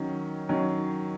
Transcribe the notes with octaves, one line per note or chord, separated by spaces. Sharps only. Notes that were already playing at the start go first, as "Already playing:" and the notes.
Already playing: D#3 F#3 C#4
D#3 F#3 C#4